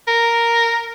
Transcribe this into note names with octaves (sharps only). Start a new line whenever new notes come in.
A#4